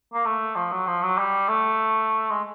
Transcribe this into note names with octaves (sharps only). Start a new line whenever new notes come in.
A#3
A3
F3
F#3
F3
F#3
G3
A3
G#3